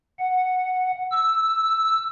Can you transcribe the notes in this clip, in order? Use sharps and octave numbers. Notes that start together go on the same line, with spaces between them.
F#5
E6